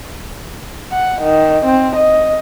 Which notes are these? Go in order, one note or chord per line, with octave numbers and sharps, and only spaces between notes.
F#5
D#3
C4
D#5